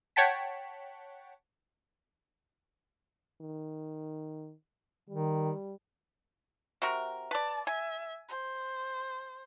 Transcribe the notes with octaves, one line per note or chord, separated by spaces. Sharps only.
C#5 F#5 G5 A5 B6
D#3
D#3 G3
C3 F#4 A#4
B4 D5 A5
E5 G#5
C5